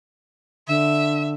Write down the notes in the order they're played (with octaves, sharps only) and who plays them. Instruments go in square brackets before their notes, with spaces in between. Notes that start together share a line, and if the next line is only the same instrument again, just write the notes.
[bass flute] D3 [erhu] E5